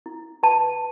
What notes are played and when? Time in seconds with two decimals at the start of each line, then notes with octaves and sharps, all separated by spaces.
0.06 E4
0.43 B4 A5